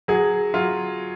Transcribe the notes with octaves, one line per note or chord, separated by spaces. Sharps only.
F#3 G#4
F#3 F4